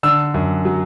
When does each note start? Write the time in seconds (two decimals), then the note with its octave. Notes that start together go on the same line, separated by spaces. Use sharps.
0.03 D3 E6
0.34 F#2
0.65 F#3